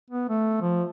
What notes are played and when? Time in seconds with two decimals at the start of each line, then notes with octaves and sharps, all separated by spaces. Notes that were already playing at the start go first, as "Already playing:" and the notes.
0.10 B3
0.29 A3
0.61 F3